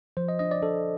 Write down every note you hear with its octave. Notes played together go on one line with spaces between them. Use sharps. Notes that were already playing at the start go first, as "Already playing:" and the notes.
F3 C5
D#5
D4 D#5
D5
D4 A4